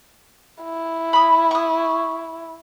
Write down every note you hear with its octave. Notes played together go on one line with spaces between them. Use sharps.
E4
B5 D#6
C#6 D#6